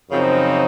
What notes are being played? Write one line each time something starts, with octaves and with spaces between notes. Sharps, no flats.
F#2 C#3 F3 C4 D#4